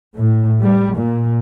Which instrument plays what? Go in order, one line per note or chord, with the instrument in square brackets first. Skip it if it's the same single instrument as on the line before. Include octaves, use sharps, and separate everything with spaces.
[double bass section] A2
G3
A#2